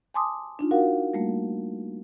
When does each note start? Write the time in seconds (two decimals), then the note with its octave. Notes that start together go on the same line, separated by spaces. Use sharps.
0.14 G#5 A5 C6 D6 D#6
0.59 D4 D#4 F4
0.71 F#4 A#4 F5 F#5
1.14 G3 A3 A#3